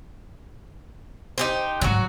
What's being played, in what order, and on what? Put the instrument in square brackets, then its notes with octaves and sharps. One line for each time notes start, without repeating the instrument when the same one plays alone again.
[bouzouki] D#4 G4 C5
[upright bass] G#2 D3 [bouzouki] F#3 F#4